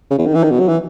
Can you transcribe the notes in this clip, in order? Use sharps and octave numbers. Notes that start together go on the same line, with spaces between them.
C#3
E2
D#3
E3
D#3
B2
F#3
E3